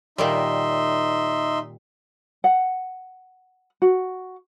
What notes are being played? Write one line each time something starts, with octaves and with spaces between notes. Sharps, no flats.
A#2 D#3 G3 D#4 E5 C6
F#5
F#4